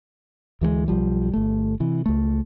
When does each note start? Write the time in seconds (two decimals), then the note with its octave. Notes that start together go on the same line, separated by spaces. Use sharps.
0.61 D2 E3 F#3 G#3
0.88 B1 F3 G3
1.33 G1 A3
1.80 C3 E3
2.06 C#2 A3